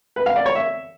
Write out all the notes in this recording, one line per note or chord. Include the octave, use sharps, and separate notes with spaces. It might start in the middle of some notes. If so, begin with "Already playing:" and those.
B4
F5
D5
C#5
E5